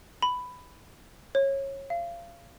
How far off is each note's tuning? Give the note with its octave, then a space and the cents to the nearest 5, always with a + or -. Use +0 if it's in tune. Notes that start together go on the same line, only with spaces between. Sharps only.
B5 +10
C#5 -20
F5 -30